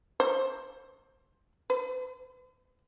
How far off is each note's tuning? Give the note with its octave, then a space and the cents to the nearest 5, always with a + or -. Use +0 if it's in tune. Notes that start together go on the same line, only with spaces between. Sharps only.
C5 +15
C5 -45